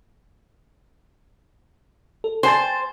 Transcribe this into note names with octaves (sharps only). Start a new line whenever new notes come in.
A4
C5 G5 G#5 A6